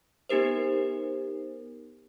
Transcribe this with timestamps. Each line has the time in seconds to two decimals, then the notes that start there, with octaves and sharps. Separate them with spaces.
0.29 B3 D#4 G4 A#4 C5